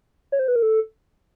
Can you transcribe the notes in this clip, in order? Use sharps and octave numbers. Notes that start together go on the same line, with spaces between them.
C#5
C5
B4
A#4
A4